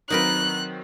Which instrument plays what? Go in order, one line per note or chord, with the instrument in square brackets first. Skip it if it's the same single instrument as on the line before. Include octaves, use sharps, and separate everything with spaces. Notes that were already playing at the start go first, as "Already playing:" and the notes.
[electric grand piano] D#3 F#3 C4 [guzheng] D#4 A#4 B4 [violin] F#6